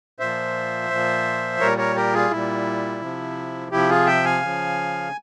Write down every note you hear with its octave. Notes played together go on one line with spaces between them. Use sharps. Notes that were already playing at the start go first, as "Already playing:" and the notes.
A#2 F3 C5 E5
A#2 F3
A#2 G3 A#4 C#5
A#4 C#5
G4 A#4
F4 G#4
A#2 G3 E4
C3 F3
C3 F3 E4 G4
F4 G#4
E5 G5
F5 G#5
C#3 F3